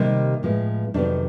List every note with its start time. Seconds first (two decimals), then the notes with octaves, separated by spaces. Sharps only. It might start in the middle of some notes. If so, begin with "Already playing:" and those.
Already playing: C3 D#3 G3 A#3
0.43 A2 F3 G#3 B3
0.94 F2 C3 D#3 F#3 B3 D4